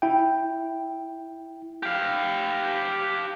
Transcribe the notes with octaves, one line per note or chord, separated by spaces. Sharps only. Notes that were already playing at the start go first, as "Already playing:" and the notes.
E4 G5
G4 F5